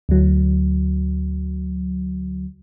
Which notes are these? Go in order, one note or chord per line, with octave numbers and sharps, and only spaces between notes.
D2 F#3